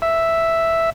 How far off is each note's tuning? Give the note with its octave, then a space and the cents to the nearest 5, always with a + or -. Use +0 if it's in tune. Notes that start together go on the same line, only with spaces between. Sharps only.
E5 +0